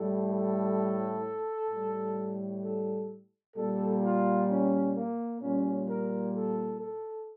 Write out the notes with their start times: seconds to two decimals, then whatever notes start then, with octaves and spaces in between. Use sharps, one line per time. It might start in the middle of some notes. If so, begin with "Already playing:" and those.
Already playing: A2 G3 A4
0.29 A4
1.69 A2 G3
2.62 A4
3.55 A#2 G3 A4
4.02 F4
4.48 C#4
4.95 A#3
5.41 A#2 G3 C#4
5.88 A#4
6.34 A4
6.81 A4